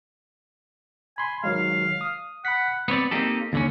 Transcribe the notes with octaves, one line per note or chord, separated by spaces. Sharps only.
G#5 B5 C6
D#3 F#3 G#3 F5
D#6
F#5 B5 B6
B3 C4 C#5 D5
A#3 C4 D#4 G4 A4
D#2 D3 C#4